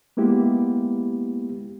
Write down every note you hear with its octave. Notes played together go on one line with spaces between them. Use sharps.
G#3 A#3 B3 E4 G4